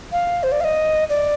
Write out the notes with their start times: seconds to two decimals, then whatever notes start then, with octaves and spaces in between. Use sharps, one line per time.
0.12 F5
0.43 C5
0.52 D5
0.61 F5
0.64 D#5
1.10 D5